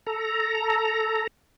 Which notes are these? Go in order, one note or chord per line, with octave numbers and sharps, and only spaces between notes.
A4 A#5